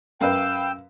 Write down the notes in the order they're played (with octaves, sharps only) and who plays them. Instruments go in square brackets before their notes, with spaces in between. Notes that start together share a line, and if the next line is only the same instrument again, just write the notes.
[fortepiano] F#2 [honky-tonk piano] B4 F5 [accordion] G5 [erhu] E6